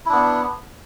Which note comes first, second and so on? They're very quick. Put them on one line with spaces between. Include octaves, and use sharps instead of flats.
E4 D4 B3